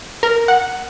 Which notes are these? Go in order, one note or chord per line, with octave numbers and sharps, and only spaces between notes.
A#4
F#5